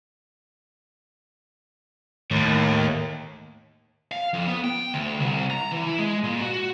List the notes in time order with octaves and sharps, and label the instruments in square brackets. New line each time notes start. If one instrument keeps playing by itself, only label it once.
[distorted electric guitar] D#2 [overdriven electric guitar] A2
[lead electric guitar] F5
F2
B3
G5
D2
C2
A#5
E3
E4
G#3
A#2
F#4